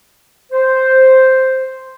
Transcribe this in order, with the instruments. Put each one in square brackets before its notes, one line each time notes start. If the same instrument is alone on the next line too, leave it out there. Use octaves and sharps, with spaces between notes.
[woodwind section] C5